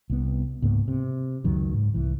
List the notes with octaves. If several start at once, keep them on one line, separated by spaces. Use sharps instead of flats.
C2 B3
C#2 G#2 A#3 B3
C3
C#2 F#2 D#3 F#3
G#2
C2 E3